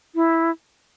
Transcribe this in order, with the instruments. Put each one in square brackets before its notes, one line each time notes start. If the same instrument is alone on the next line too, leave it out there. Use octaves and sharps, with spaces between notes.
[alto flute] E4